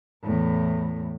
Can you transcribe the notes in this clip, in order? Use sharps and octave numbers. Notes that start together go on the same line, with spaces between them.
E2 A2